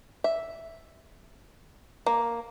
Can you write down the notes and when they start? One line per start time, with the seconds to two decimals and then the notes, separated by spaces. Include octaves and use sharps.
0.24 E5
2.06 A#3